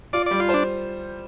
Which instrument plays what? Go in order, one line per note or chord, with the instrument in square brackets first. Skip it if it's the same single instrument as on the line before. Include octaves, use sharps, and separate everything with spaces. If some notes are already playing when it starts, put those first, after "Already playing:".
[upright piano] F4 [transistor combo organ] D5
[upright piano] G3 [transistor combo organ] D5
[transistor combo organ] F4
[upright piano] C5
[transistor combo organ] D4